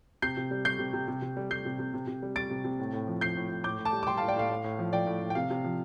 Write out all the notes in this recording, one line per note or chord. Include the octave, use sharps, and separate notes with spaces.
C3 G6 C7
C3
G3
G3 G6 C7
C3
C3
C3
C3
G3
G3 G6 C7
C3
C3
C3
C3
G3
G3 A6 D7
C3
C3
A2
A2
F3
F3 G6 C7
A2
A2
A2 D6 G6
A2
A5 D6
G3
D6
G3 G5 C6
A2 F5 A5
D5 G5
A2 F5
A2
A2
F3
F3 D5 G5
A2
A2
G5
C3 F5
C3
F3